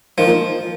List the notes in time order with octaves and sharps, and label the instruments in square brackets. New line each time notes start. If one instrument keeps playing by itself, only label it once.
[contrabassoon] D#3 [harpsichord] F3
[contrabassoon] A#2